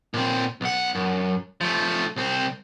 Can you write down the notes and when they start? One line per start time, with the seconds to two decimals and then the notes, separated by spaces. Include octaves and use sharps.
0.14 A#2 C4
0.61 B1 F#5
0.95 F#2
1.61 F3 A3
2.16 C2 C4